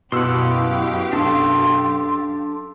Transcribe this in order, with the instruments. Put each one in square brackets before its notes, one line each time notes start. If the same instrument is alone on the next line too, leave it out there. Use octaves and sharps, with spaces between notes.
[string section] F#2 G4 F5 [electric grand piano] B2 E6 [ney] E4 [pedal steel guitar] F#5 C6
[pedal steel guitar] D4 A4 [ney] C6